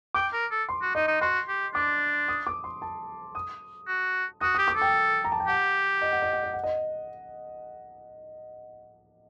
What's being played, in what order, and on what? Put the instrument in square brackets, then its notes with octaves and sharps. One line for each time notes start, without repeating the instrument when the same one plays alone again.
[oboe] G5 [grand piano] D6
[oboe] A#4
A4
[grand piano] C6
[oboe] F#4
[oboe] D#4 [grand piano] D#5
[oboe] D#4
[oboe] F#4 [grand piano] C6
[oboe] G4
[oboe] D4 [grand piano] D6
[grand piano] D#6
D6
C6
A5
D#6
[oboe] F#4
[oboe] F#4 [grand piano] D#6
[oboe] G4 [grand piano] D#6
[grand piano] D6
[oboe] A4
[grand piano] G5
A#5
A5
G5
[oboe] G4 [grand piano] F#5
[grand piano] D#5
F#5
D#5
F#5
D#5
F#5
D#5